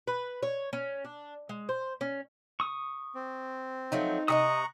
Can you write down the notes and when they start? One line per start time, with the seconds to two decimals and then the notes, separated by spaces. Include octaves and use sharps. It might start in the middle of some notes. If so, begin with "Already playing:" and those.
0.08 B4
0.43 C#5
0.73 C#4
1.05 D4
1.49 G#3
1.69 C5
2.01 C#4
2.60 C#6 D#6
3.15 C4
3.92 F3 F#3 A3 D#4
4.28 C3 G4 D#5 A#5 C#6 D#6 F#6